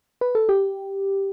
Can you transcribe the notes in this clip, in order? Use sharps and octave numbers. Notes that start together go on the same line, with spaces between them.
B4
A4
G4